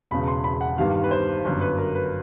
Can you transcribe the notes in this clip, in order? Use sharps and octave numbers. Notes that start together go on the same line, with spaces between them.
E1 E2 C#3 B5
C6
B5
F#5
G1 G2 D#3 G3 F5
B4
C5
G1 F#2 D3 B4
B4
A#4
B4